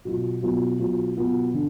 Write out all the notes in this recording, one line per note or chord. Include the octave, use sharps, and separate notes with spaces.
B2 F#3 B3 F4
B2 F#3 B3 F4
B2 F#3 B3 F4
B2 F#3 B3 F4
D3